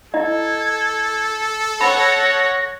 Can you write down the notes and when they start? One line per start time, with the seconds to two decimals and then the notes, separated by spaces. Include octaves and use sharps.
0.14 E4 A4 D#5 G#6
1.81 C#5 F#5 B5 A#6